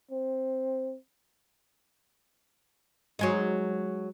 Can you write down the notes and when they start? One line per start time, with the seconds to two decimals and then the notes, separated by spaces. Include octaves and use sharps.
0.11 C4
3.19 F#3 G#3 D#4